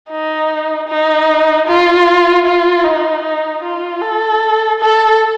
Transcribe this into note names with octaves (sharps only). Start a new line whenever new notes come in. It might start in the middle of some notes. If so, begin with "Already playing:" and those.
D#4
D#4
F4
F4
D#4
D#4
F4
A4
A4